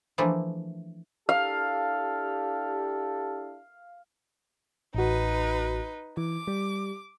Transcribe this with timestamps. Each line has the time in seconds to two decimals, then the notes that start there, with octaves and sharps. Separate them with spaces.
0.18 E3 F3 A3 A#3 D4 E4
1.29 D4 E4 G4 A4 F5
4.95 A1 D#4 F#4 B4
6.17 E3 D6
6.48 G3